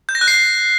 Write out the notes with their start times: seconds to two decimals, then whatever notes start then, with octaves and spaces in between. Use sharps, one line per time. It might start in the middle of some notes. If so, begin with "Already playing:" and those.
0.09 G6
0.15 A#6
0.21 F#6
0.28 C7